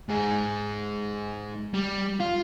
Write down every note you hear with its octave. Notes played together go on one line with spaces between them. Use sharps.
G#2 G#4
G3
F4